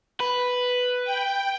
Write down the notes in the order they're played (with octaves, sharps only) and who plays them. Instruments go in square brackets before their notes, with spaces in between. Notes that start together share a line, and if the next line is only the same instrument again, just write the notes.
[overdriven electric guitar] B4
[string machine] G5